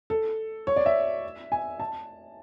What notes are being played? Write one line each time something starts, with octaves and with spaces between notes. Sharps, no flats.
A4
C#5
D5
E5
G#5
A5